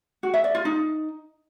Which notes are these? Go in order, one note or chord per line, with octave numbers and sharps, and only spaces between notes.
F#4
E5
D5
F4
D#4